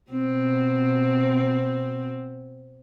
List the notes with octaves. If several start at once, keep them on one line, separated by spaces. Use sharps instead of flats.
B2 C4